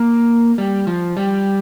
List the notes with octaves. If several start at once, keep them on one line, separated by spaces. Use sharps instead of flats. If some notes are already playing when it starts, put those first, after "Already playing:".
Already playing: A#3
G3
F3
G3